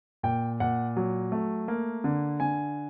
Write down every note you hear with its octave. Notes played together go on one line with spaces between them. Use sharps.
A#2 G5
A#2 F#5
F#3
A3
A#3
D3
D3 G#5